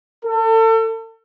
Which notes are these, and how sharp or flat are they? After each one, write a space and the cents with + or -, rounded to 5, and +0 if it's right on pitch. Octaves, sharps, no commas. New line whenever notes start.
A4 +35